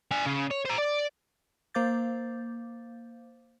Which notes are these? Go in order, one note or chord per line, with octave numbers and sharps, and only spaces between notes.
D4 G#5
C#3
C#5
C5 A#5
D5
A#3 C5 F5 D6 G6 A6